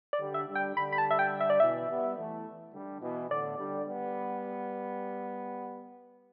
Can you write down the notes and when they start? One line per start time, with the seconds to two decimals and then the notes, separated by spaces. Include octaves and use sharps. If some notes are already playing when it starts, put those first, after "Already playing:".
0.13 D5
0.20 D3 G3
0.34 E5
0.49 D3 G3
0.55 G5
0.77 D3 G3 B5
0.92 B5
0.98 A5
1.11 E5
1.19 G5
1.41 E5
1.50 D5
1.60 B2 E3 E5
1.90 G3 B3
2.17 E3 A3
2.74 D3 G3
3.02 B2 E3
3.30 A2 D3 D5
3.58 D3 G3
3.87 G3 B3